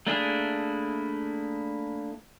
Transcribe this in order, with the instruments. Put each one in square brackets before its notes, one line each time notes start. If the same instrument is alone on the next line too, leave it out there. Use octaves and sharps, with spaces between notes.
[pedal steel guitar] A3 A#3 D4 E4 G#4